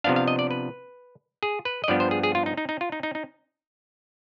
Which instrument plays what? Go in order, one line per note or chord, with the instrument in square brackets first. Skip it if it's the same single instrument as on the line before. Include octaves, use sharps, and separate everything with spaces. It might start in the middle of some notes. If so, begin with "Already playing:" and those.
[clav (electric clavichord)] C3 F3 B3 D4 F5
F5
D#5
D5
B4
G#4
B4
D#5
G2 F3 B3 D4 D5
C5
G#4
G#4
F4
D#4
D#4
D#4
F4
D#4
D#4
D#4